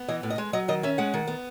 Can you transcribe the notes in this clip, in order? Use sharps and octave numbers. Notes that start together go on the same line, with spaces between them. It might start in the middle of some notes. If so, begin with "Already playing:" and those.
Already playing: B3
E3 D#5
A2
D#5
G#3
F#3 D#5
D#3 D#5
C#4 E5
G#3 F#5
D#3
B3